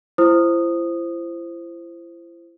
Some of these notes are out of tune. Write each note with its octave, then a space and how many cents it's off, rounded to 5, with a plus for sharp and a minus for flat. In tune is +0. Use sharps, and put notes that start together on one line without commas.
E4 +40 C5 +0 D#6 -10